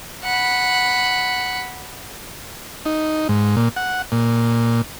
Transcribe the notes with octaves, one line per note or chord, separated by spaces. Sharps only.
F#5 B5
D#4
G#2
A#2
F#5
A#2